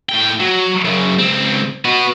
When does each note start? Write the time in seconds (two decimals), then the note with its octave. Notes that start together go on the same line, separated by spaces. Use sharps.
0.09 A2 G5
0.40 F#3
0.85 F#2 C#3
1.19 C#2 C4
1.85 B3 F#4